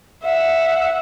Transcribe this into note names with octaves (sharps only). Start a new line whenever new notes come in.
E5 F#5